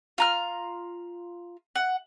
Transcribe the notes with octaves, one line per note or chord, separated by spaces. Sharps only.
F4 A#5 F6
F#5